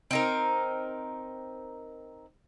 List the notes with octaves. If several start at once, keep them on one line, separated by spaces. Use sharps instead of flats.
C4 D#4 A#4